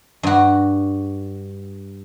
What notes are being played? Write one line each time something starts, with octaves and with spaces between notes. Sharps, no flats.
G2 F#4